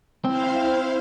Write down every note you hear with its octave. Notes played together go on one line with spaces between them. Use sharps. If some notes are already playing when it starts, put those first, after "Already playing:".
C4 E4 C5 F5